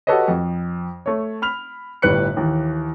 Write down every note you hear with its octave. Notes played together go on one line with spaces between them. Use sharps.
F#4 G4 A4 B4 C#5 D#5
F2
A3 C#5
B5 F6 F7
G1 A2 G3 B4 F#6 C#7
D#2 E3